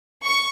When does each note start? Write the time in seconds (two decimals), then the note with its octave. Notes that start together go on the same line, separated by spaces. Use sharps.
0.25 C#6